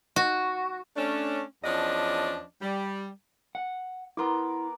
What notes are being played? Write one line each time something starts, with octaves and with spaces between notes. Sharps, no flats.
F#4
A3 C#4 D4
E2 F3 C#4 D4 D5 D#5
G3
F#5
B3 E4 A#4 C6 D6